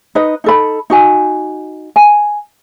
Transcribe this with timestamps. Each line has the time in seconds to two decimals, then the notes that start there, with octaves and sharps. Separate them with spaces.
0.15 D#4 B4 D#5
0.44 D#4 A4 B5
0.90 D#4 F#4 G#5
1.96 G#5